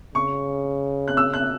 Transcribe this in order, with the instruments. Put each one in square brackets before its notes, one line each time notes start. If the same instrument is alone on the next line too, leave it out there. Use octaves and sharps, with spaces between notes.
[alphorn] C#3 [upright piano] C#6
[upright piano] F#6
E6
F#6